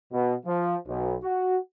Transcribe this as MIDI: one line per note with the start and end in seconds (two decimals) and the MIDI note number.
0.13 0.35 47
0.46 0.76 53
0.87 1.15 35
1.23 1.57 66